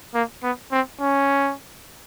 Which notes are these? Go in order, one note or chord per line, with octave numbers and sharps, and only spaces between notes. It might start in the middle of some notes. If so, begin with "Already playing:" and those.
A#3
B3
C4
C#4